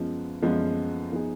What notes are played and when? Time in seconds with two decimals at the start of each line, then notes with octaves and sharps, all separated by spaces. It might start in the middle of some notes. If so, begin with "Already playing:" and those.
Already playing: F#2 F3 G#3 B3 F4
0.42 F#2 F3 G#3 B3 F4
1.12 F3 B3 D#4 G#4